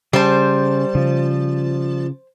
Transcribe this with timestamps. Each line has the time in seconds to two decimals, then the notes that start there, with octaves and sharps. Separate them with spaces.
0.13 C#3 G3 C5 A5
0.95 C#3 F3